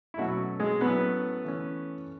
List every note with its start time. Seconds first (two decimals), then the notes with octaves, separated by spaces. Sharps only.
0.14 E4
0.18 B2 F#3 A3 C#4 F#4
0.60 G#3 G#4
0.81 A2 F#3 A3 B3 C#4 B4
1.45 E3 A3 C#4